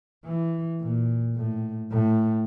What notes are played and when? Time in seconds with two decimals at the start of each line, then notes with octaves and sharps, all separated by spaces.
0.25 E3
0.80 A#2
1.36 A2
1.91 A2